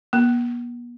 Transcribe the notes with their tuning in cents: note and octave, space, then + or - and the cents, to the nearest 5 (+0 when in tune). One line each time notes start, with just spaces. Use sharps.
B3 -45